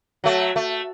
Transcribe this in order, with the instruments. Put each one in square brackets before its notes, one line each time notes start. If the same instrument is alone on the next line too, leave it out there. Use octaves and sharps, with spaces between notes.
[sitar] F#3 A3
A3